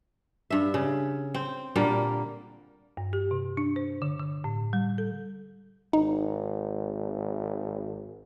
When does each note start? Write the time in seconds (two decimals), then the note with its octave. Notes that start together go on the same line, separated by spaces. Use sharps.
0.50 G2 E5
0.74 C#3
1.34 C4
1.76 A#2 D3 G3 A#3
2.97 G2
3.13 G4
3.31 C3
3.57 D4
3.76 C5
4.02 D3
4.19 D3
4.44 A2
4.73 G3
4.98 A4
5.93 G#1 D#4